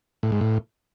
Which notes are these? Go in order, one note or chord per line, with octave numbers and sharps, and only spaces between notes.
A2
G#2
A2